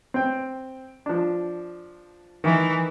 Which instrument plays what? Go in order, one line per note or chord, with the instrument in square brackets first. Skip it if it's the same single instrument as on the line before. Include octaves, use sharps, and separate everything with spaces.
[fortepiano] C4 G5
F3 D4
[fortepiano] D#3 E4 [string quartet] E3